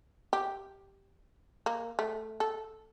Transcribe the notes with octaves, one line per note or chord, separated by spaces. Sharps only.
G4
A#3
A3
A4